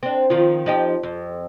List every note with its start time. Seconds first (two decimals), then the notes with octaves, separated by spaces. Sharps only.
0.03 C4 D4
0.30 D#3 F3 F4
0.66 F3 D#4 G4
1.03 F2